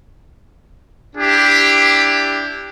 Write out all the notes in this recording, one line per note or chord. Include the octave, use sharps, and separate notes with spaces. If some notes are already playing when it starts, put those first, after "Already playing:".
D4 E4 G4